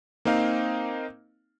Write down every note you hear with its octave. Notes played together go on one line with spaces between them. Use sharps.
A#3 C4 D#4 F5